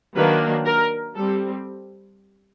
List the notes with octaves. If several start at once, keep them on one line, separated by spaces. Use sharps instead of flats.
D#3 F#3 A#3 D4 B4
A#4
G3 C4 A4